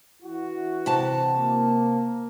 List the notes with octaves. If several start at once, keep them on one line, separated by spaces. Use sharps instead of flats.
E3 E4 F#4
C3 A5
A#3